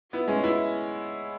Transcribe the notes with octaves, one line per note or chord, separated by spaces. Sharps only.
B3 E4
G#3 C#4
B3 E4